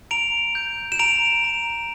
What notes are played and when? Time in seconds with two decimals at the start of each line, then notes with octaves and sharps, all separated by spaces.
0.11 A#5 D7 F7
0.55 G6
0.92 E7
0.99 A#5 D7 F7
1.44 A#5